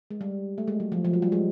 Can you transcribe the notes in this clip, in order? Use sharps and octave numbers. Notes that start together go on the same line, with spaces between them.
G#3
G3
A3
G#3
F#3
F3
F3
F#3
G3
G#3